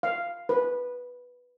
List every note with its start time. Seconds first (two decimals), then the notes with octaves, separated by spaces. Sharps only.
0.03 F5
0.49 B4